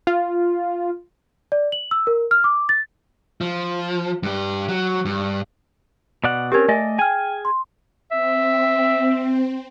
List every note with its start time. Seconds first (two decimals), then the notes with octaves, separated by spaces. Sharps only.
0.07 F4
1.52 D5
1.72 F#7
1.91 E6
2.07 A#4
2.31 F6
2.44 D6
2.69 A6
3.41 F3
4.23 G2 G4
4.69 F#3
5.05 G2
6.24 B2 D5 F#5
6.52 C4 C#4 G4 A#4 G#6
6.68 A3 D5 D#5 G#5
6.99 G#4 G5 G#5 F6
7.45 C6
8.11 C4 E5